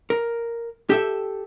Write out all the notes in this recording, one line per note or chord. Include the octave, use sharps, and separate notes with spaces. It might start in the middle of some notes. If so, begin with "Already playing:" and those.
A#4
G4 A4 E5